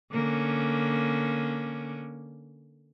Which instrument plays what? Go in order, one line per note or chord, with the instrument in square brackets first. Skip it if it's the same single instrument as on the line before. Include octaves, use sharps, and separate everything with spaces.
[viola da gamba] D3 A#3 C#4